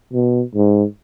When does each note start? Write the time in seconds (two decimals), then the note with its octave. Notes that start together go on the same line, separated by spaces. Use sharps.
0.13 B2
0.55 G#2